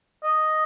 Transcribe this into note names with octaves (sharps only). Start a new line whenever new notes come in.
D#5